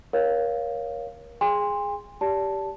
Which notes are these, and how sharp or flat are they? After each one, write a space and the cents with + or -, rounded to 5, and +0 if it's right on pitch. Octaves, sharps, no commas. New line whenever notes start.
A#4 +25 C#5 +0 F5 +0
G#4 +0 G#5 -45 C6 +0
G4 +0 D5 -30 A5 +0